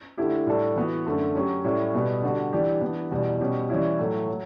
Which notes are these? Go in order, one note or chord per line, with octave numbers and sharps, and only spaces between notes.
D3 A3 E4 G4
A2 G3 D4 A4
E3 B3 F#4
F#2 D3 A3
F#3 C#4 G4
A2 G3 C#4 E4
B2 G3 B3
D3 G3 D4 F#4
E3 G3 D4 G4
E3 B3 D4
E2 B2 G3
B2 G3 C#4 G4
E3 G3 C#4 E4
A2 F#3 A3
F#3